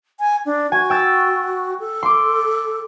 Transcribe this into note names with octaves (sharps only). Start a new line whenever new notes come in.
G#5
D4
F#4 G#5
G5 E6 A6
A4
C6 D6